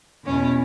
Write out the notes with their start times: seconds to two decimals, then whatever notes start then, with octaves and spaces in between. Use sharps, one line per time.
0.25 E2 B2 C#4